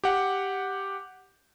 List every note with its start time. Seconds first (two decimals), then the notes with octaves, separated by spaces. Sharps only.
0.04 G4 F#5